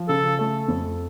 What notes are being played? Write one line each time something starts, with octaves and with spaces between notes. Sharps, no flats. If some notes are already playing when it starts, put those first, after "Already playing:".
Already playing: F3
C#3 A4
A3
F2